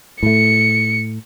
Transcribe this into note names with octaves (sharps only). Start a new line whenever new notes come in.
A2 A3 C#7